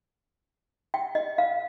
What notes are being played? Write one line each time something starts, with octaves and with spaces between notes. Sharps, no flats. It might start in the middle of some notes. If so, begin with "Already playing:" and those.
G5
D#5
F5